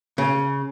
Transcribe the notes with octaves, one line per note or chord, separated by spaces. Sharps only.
C#3